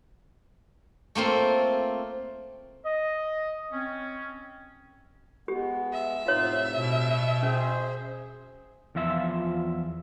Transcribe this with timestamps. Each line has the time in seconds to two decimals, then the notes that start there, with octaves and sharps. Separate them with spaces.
1.15 A3 A#3 C4 F4
2.85 D#5
3.71 C4 C#4
5.48 G#3 B3 G4
5.93 E5
6.27 A2 C3 D#4 F4 C#5 F5
6.77 B2
7.43 C#4 G#4 C5
8.95 E2 F3 F4 E5